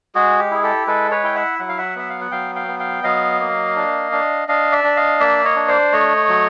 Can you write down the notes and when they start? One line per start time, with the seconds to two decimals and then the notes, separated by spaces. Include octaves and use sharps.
0.15 G#3 F#4 G#4
0.39 G4
0.51 E4 G#4
0.63 G4 A4
0.87 G#3 A4 B4
1.11 B4 C#5
1.23 E4 G5
1.35 E5 F#5
1.59 F#3 F#5
1.69 F5
1.78 E5 F#5
1.96 B3 E5
2.10 F5
2.21 F#5
2.31 F#3 F5 G5
2.55 F5 G5
2.68 B3
2.80 F5 G5
3.04 F#3 D#5 F5
3.40 A#3
3.76 D4
4.12 D4
4.48 D4 D#5 F5
4.72 D5 E5
4.84 D4
4.96 D#5 F5
5.20 A#3 D5 E5
5.44 C#5 D#5
5.56 D4
5.68 C5 D5
5.92 A3 C#5 D#5
6.29 F#3